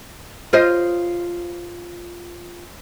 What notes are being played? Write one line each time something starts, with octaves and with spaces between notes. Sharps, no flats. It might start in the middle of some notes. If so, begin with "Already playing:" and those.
F4 C5 D#5